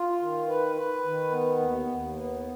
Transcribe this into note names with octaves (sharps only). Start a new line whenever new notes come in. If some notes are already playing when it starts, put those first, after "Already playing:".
Already playing: F4
D#3
B4
B4
D#3
B3
D#2
D#2
B3